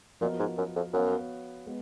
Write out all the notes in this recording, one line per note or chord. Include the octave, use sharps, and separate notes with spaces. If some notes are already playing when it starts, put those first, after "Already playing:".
A#2 F3 B3 F#4 A#4 D#5
G#2
F#2
F2
F#2 B3 F#4 C#5 F5
G#3 B3